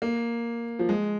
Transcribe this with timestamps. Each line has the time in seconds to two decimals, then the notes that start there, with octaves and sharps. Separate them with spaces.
0.02 A#3
0.79 F3
0.89 G#3